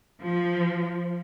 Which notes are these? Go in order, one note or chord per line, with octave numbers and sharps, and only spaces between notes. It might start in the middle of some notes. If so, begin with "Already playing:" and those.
F3